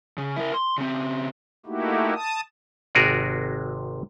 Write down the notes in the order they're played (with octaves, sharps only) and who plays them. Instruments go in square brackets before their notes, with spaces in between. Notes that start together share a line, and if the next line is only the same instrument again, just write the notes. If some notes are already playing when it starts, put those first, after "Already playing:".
[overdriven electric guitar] C#3
E4 A#4
C6
C#3 C4
[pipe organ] A3 A#3 D#4 E4 F#4 G4
A5 D#6
[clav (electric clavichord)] G#1 C3 F#4 G#4 A#4 D5